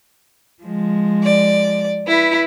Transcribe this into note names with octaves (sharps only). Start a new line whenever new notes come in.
F3 G#3
D5
E4 B4